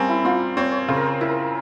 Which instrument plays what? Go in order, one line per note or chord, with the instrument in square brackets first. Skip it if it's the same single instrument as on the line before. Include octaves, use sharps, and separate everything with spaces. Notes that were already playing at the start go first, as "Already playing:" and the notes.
Already playing: [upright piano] G3 C4 [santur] A#3 C#4
[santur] E4
[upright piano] C4 [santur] F4
[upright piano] C4 [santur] C#5
[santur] C#5
[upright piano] C#3 [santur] C5
[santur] A#4
C5
[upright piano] E4 [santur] A#4